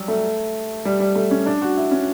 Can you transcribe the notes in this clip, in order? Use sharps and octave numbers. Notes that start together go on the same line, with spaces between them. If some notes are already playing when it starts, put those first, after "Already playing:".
Already playing: F#3 G3
A3
G3
G3
A3
C#4
D4
F#4
E4
C#4